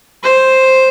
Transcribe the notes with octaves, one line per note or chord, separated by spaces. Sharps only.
C5